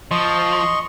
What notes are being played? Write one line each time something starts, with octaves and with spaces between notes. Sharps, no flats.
F3 D#5 C6 C#6